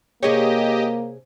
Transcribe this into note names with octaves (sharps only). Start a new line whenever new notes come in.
C3 A#3 G4 G#4 C#5 D#5